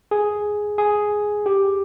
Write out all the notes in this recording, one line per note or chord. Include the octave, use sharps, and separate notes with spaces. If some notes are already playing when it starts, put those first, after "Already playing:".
G#4
G#4
G4